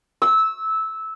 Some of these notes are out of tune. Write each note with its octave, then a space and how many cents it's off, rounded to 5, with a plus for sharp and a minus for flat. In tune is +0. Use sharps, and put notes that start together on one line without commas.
E6 -15